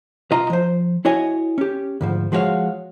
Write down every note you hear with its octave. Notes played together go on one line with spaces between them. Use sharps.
B1 F4 D#5 A#5
F3 C5
E4 F#4 C#5 D#5 G#5
C#4 G4
D2 G#2 F3
F3 G#3 F#4 G4 C#5 F5